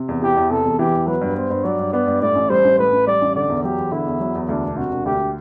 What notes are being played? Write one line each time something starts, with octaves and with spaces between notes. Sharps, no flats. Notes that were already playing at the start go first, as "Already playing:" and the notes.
Already playing: C3
E2
E3 G4
E2
C3 A4
E2
E3 G4
E2
F#3 B4
G2
B3 C5
G2
F#3 D5
G2
B3 D5
G2
A2 D5
A1
G3 C5
A1
A2 B4
A1
G3 D5
A1
D3 D5
E2
F#3 G4
E2
D3 E4
E2
F#3
E2
D2 D4
E1
C3 F#4
E1
D2 G4